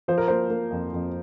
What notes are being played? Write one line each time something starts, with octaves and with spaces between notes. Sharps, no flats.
F3 C5
A#4
A#3 C5
A#3
F2
F2